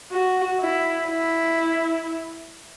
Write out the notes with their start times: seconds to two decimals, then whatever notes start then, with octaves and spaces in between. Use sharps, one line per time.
0.12 F#4
0.60 E4
1.09 E4